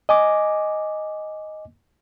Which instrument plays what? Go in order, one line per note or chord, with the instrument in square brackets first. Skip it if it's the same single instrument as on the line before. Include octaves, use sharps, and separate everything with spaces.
[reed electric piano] D#5 G#5 D6